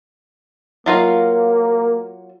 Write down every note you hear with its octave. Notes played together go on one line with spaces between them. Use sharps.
F#3 A#3 F4 F5